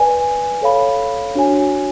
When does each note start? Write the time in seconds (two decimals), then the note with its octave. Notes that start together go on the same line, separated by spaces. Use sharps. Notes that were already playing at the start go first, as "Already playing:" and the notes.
Already playing: B4 D5 G#5
0.62 A4 C#5 F5 B5
1.35 D4 F#4 C#5 G#5